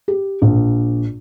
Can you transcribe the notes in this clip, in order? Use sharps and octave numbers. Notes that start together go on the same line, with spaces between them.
G4
A#1